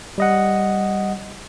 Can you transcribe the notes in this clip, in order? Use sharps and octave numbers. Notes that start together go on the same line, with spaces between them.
G3 D#5 F#5